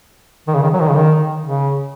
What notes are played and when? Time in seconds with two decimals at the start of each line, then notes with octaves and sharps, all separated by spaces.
0.48 D#3
0.54 C#3
0.63 D#3
0.74 F#3
0.82 D#3
0.89 C#3
0.96 D#3
1.44 C#3